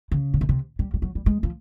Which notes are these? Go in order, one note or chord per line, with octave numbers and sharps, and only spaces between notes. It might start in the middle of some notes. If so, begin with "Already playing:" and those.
C#3
C3
B2
C3
G3
G3
F#3
G3
G#3
F3